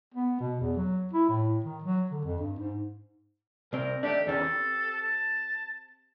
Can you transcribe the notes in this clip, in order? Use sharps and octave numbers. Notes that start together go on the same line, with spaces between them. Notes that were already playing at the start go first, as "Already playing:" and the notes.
B3
B2
E2
F#3
E4
A2
D#3
F#3
D3
F2
G2
G#2
C2 C4 A#4
D#3 A3 D4 G4
E2 D#3 C#4 A4
C4 G4 B5
A5